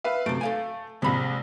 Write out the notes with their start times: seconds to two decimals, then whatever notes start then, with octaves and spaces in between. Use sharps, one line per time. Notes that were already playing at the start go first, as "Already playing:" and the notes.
0.04 B4 E5 F5
0.26 F#2 C3 A3 D7
0.41 A4 F5 G#5
1.02 A#1 C3 G#3 B5